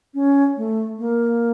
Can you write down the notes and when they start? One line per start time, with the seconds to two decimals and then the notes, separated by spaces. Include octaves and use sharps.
0.14 C#4
0.57 A3
0.98 A#3